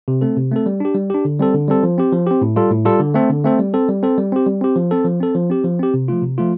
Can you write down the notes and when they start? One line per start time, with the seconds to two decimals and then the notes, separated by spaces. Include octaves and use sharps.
0.08 C3
0.21 A3 C4 A4
0.37 C3
0.52 A3 C4 A4
0.66 G3
0.80 D4 G4
0.95 G3
1.10 D4 G4
1.25 D3
1.40 G3 C4 A4
1.54 D3
1.68 G3 C4 A4
1.83 F3
1.98 C4 G4
2.12 F3
2.27 C4 G4
2.41 A2
2.56 G3 F4 A4
2.71 A2
2.85 G3 F4 A4
3.00 D3
3.14 A3 C4 A4
3.30 D3
3.44 A3 C4 A4
3.59 G3
3.74 C4 A4
3.88 G3
4.03 C4 A4
4.18 G3
4.32 C4 G4
4.46 G3
4.61 C4 G4
4.76 F3
4.91 C4 A4
5.05 F3
5.21 C4 A4
5.35 F3
5.50 C4 G4
5.64 F3
5.79 C4 G4
5.94 C3
6.08 F3 A3 F4
6.22 C3
6.38 F3 A3 F4